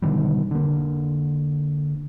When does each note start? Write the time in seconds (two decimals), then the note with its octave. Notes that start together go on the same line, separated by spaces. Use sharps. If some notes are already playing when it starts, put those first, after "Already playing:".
0.02 B2 D3 D#3 G3
0.51 D3 A#3